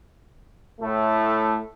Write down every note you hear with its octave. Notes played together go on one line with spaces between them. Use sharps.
A2 A3